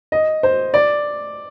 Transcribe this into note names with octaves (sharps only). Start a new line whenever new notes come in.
D#5
C5
D5